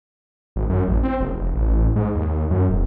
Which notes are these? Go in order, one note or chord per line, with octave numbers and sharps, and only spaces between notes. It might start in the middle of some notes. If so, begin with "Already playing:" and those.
G#1
F#2
A1
C4
F#1
F1
A1
A1
G#2
D#2
F#2
E1